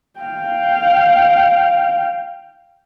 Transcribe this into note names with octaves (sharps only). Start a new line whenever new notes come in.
F5 G5